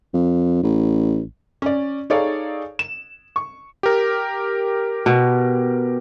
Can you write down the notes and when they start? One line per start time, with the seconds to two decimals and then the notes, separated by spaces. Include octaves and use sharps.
0.14 F2
0.63 A1
1.62 C#4 D5
2.10 D#4 G#4 A4 C#5 D5 F5
2.79 E7
3.36 C#6
3.83 G4 A#4
5.06 B2